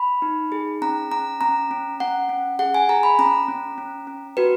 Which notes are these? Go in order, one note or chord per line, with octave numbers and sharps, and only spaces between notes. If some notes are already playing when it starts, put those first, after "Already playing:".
Already playing: B5
D#4
G#4
C#4 A#5
C#4 A#5
C#4 A#5
C#4
C#4 F#5
C#4
G#4 F#5
G#5
G#4 A#5
B5
C#4 A#5
C#4
C#4
C#4
F#4 B4